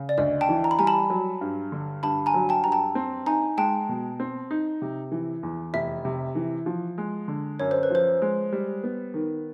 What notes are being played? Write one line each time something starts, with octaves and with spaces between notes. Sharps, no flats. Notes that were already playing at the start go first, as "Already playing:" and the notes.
Already playing: C#3
D5
D2 D#5
G5 A5
E3
A#5
B5
G3 G#5 A#5
A5 B5
F#3
G2
D3
G2 A5 B5
G#5 A#5
F#3
G5 A5
G2 A#5
G5 A5
C4
D#4 G#5 A#5
G#3 G5 A5
B2
C4
D#4
C3
E3
E2
F1 E5
C3
E3
F3
G#3
D3
F#2 C#5
C5
B4
F3 C5
G#3
G3
B3
D#3